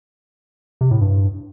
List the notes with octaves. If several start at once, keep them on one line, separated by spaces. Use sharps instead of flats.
C3
A2
G2